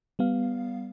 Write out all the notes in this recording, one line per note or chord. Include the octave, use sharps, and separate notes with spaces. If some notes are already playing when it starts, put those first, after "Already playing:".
G3 B3 F5